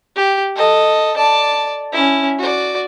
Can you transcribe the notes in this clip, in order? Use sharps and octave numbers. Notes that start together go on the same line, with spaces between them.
G4
A4 D#5
D5 A5
C#4 E4
F#4 D5